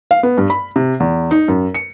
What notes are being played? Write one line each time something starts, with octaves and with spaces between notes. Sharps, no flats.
F5
B3
G2
B5
C3
E2
D#4
F#2
C#7